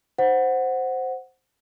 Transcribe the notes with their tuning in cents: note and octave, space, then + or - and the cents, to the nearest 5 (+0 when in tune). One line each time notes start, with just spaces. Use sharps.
C5 +0 F#5 +0